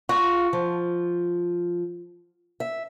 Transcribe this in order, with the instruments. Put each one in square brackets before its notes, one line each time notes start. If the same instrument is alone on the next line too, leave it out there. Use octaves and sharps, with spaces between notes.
[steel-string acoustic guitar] F4 [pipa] F#4
[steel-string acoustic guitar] F3
E5